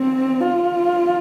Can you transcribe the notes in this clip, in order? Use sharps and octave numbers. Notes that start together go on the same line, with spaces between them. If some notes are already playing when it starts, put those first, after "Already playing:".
Already playing: C4
F4